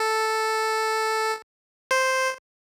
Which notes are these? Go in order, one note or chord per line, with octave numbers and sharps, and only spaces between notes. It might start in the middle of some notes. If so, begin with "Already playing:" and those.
Already playing: A4
C5